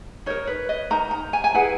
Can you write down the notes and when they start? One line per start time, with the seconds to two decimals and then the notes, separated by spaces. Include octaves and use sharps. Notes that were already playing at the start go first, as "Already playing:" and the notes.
0.26 D#4 A#4 C#5
0.47 B4
0.69 D#5
0.90 D#4 A#4 A#5
1.11 A#5
1.33 G#5
1.44 G#5
1.54 E4 G#4 B4 F#5